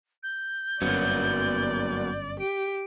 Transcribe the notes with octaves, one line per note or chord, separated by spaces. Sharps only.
G6
G1 F#2 F#3 A#3 B3 D5
G4 D7